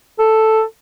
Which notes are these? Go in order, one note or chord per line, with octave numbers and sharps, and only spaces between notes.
A4